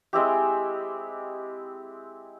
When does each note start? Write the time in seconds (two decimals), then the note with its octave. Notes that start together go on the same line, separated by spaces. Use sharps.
0.13 G#3 C4 E4 G4